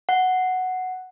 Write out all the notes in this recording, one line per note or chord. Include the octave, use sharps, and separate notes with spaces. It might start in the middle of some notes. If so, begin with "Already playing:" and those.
F#5